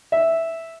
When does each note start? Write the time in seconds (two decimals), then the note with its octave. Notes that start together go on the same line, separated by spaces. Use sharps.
0.12 E5